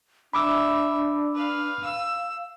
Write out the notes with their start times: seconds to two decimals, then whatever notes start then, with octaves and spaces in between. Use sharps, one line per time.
0.33 D4 E5 B5 D6 E6
1.36 B4 F5
1.84 F5 E6